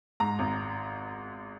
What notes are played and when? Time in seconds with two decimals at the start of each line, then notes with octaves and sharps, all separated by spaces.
0.20 G#2 A#5
0.39 G#1